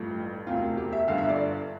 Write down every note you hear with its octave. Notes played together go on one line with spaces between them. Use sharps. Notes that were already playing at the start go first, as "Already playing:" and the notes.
Already playing: A1 G2 F3 A3
E1 D2 C3 F4
G4
E5
G1 G2 D3 F5
E5
D5